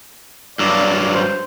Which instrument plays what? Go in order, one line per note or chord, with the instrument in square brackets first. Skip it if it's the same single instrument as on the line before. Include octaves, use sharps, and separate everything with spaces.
[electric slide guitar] G2 F#3 [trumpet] D5
[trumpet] C5